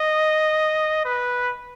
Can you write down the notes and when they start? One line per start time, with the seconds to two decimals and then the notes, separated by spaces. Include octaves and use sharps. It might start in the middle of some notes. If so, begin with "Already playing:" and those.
Already playing: D#5
1.05 B4